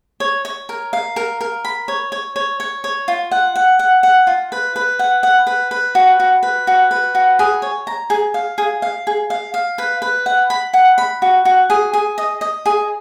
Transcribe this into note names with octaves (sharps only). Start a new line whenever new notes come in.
C#5
C#5
A#4
F5
A#4
A#4
B5
C#5
C#5
C#5
C#5
C#5
F4
F#5
F#5
F#5
F#5
F4
B4
B4
F#5
F#5
B4
B4
F#4
F#4
B4
F#4
B4
F#4
G#4
C#5
A#5
G#4
F5
G#4
F5
G#4
F5
F5
B4
B4
F#5
B5
F#5
B5
F#4
F#4
G#4
G#4
D#5
D#5
G#4